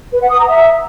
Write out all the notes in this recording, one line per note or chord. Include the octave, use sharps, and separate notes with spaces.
B4
F#5
D#6
A#5
E5